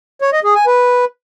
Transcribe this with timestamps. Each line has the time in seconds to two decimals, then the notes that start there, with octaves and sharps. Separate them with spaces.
0.22 C#5
0.33 D#5
0.44 G#4
0.55 G#5
0.67 B4